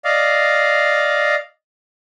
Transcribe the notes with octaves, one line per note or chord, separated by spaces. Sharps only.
D5 D#5 F5